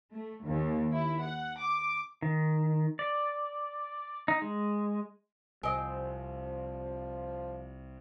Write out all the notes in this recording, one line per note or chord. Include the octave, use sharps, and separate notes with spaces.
A3
D#2
E4
F#5
D6
D#3
D5
D#4
G#3
C2 F3 C4 D#5 G#5